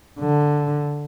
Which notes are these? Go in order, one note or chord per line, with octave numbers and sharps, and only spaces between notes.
D3